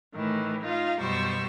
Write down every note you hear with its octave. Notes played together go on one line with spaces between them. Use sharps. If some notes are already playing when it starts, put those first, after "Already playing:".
A2 D#3 E3 A3
D#4 F4 F5
F#2 B2 G3 C5 C#6 E6